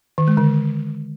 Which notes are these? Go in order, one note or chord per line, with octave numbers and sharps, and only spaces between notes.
D#3
G#3
D3